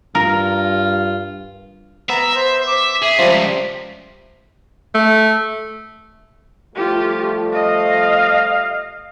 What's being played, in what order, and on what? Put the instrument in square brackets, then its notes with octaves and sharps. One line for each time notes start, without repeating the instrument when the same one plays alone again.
[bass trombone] G2 [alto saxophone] F4 [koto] A#4
[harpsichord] B3 [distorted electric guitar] E5 [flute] A#5
[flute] C5
D6
[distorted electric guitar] G#4 [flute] E5
[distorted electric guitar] C#2 [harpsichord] F3 G3
[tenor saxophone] A3
[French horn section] F3 G3 A3 [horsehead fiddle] F4 G4
[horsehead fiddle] D#5 [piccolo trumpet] F5